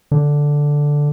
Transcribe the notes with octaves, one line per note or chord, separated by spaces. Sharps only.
D3